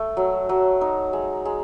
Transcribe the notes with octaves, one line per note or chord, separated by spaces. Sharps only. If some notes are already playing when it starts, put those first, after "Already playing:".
Already playing: A3
F#3
F#3
D#4
G#3
G#3